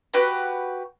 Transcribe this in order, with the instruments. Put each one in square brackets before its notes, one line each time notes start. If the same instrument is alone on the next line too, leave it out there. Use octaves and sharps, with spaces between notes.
[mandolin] F#4 G4 B4 F#5